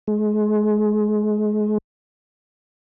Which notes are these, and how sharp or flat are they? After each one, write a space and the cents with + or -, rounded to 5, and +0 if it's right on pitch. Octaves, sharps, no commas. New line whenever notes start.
G#3 +30